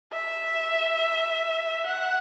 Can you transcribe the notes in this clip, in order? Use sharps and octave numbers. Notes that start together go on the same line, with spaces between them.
E5
F#5